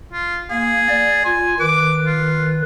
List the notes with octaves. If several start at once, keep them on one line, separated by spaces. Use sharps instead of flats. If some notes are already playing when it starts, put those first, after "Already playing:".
F4
A#3 G#4
D5
F4 G#5
D#3 B4 D6
F4